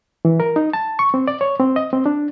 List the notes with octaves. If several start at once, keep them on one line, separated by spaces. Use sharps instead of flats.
E3
A#4
D#4
A5
C#6
C4
D5
C#5
C4
D#5
C4
D4